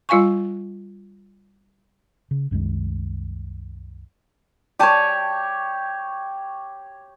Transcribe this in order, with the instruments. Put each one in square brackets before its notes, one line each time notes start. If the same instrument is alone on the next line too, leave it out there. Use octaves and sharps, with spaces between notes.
[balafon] G3 F4 F5 G#5 C#6
[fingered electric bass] C#3
C2 F#2 D#3 G#3
[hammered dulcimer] G4 C#5 [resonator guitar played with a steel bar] D5 G#5 A5